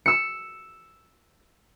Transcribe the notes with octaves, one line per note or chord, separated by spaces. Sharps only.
E6 C#7